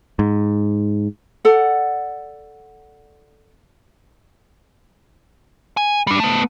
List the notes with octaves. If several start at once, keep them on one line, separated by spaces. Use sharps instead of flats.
G#2
A4 D5 F#5
G#5
G3 D4
A3 B3